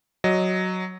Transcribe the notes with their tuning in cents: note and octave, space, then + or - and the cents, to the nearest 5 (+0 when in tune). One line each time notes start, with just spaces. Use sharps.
F#3 +0 D#5 +0